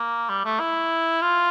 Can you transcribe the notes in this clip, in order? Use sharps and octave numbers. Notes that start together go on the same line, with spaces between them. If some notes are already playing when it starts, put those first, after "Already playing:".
Already playing: A#3
G3
A3
E4
F4